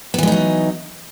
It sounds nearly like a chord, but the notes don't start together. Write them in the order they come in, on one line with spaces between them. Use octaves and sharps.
B3 E3 G#3 D#4 F#3